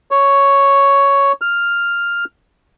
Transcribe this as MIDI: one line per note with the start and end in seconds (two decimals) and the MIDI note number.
0.11 1.32 73
1.41 2.24 89